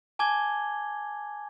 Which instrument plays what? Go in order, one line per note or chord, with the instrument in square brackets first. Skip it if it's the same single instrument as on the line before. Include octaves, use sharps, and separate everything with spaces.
[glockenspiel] G#5 A5 D6 G#6 G7